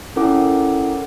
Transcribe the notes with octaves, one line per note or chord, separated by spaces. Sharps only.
C#4 E4 A4 A#4 F#5 D6